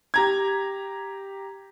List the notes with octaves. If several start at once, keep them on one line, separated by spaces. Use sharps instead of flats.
G4 A#5 G#6